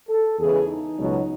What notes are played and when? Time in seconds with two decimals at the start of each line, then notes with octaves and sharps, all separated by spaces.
0.08 A4
0.38 E2 C#3 E3 G#3 G#4
0.68 D#4
0.98 C#2 B2 F#3